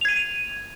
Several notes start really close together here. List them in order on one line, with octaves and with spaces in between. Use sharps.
F7 G#6 D#7